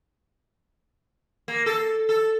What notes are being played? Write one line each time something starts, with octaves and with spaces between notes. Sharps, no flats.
A#3
A4
A4